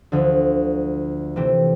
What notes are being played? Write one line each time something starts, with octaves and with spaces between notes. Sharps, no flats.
D2 D3 F3
C3 E3 A3 C4